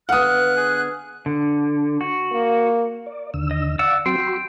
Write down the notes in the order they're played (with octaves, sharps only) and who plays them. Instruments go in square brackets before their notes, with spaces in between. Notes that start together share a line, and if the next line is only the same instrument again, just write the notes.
[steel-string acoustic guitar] D3 B3 [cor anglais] F5 [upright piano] F#5 D#6 [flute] F#6
[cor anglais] G#4
[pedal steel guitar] D3
F#4
[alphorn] A#3
[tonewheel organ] D5
D#2 D3 E6
[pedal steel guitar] D#5
[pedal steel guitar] D5 F#5 E6 [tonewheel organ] F5 D6
[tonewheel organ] F#3 C4 F#4 [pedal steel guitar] G5 C6
[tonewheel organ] F#4 B5 C#6